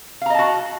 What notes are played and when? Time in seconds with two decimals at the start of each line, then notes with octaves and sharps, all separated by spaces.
0.21 F5
0.26 A#5
0.30 D#5
0.34 A5
0.39 F#4